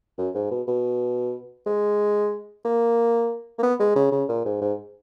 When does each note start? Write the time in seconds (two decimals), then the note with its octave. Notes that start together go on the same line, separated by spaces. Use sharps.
0.18 F#2
0.35 G#2
0.51 B2
0.68 B2
1.67 G#3
2.65 A#3
3.59 A#3
3.63 B3
3.80 G#3
3.96 C#3
4.12 C#3
4.29 A#2
4.45 G#2
4.62 G#2